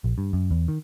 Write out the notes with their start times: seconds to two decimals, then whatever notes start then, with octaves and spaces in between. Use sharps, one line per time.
0.04 A#1
0.18 G2
0.33 F#2
0.51 E2
0.68 D#3